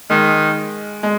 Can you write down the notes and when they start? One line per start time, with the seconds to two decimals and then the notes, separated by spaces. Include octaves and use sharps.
0.10 D#3 G#3
1.03 G#3